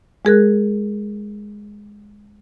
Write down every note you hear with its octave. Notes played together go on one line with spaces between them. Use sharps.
G#3 G#4 A#4 F#6